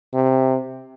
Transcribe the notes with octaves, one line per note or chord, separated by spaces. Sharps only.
C3